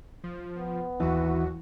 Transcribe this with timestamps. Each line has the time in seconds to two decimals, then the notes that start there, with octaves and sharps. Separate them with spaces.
0.24 F3
0.58 B3
1.00 D#2 E3 F#4